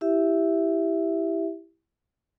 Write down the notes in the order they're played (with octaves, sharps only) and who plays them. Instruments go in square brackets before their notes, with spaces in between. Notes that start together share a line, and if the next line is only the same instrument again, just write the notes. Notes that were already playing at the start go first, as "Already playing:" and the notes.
[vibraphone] E4 G4 E5